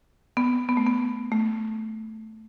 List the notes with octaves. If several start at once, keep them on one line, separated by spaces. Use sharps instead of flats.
B3
B3
A3
B3
A3